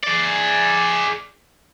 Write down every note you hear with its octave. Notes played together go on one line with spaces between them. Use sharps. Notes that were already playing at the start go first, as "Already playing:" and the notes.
G#4 D5